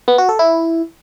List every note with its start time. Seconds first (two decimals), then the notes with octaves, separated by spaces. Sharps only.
0.08 B3
0.18 F#4
0.29 A4
0.39 E4